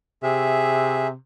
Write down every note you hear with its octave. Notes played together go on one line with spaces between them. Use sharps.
C3 G#4 E5